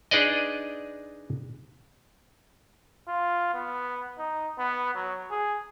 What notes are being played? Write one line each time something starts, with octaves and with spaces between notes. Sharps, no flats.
D4 D#4 G#4 B4 D5 D#5
F4
B3
D#4
B3
F#3
G#4